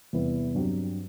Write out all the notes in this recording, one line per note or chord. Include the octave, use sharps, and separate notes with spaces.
E2 C3 G3 B3 E4
G2 F#3 C4 G4